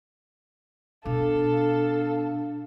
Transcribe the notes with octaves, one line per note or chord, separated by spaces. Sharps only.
B2 D4 A4 F5